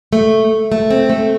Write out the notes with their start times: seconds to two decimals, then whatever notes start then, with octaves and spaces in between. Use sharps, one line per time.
0.13 A3
0.72 A3
0.90 C4
1.10 A3